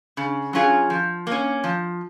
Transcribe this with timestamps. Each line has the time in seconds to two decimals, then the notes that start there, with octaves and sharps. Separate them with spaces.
0.17 C#3
0.53 F#3 C#4 F4 G#4
0.90 F3
1.27 A#3 C#4
1.64 F3